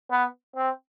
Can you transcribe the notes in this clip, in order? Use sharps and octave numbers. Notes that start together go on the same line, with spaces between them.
B3
C4